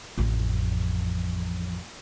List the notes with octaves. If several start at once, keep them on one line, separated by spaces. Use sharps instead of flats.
A1 F2